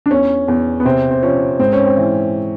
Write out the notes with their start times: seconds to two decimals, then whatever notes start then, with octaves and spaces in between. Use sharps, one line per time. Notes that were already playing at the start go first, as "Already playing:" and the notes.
0.06 D4
0.10 E2 C#4
0.48 E2
0.80 B3
0.85 C3 C4
1.11 C4
1.23 F3 C#4
1.59 G#2 C4
1.73 C#4
1.86 C4
1.97 E3